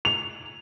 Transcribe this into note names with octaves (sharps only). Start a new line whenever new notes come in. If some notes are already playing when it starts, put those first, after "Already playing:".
F7